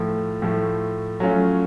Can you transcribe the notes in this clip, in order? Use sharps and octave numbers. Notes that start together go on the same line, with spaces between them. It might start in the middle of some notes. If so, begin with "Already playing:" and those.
Already playing: A2 F3 A3
A2 F3 A3
F#3 A3 C#4 F4